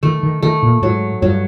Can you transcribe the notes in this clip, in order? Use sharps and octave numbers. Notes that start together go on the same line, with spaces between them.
D#3 A3
D#3
D#3 A3
A#2
G#2 F#3
G2 F#3